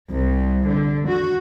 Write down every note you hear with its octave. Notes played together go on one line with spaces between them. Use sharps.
C2
D3
F#4